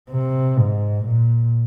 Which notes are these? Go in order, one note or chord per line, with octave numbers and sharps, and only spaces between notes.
C3
G#2
A#2